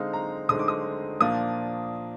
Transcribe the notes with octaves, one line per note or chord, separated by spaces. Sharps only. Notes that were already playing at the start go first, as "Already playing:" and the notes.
Already playing: D3 G#3 C4 D#4 F5
A#5
D3 G#3 C4 D#4 D#6
D6
D#6
A#2 F3 A#3 D4 D#6